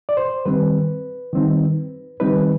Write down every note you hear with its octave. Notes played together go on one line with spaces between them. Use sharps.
D5
C5
D#3 G3 C4 B4
D#3 G3 C4 D#4
D#3 G3 C4 D#4 B4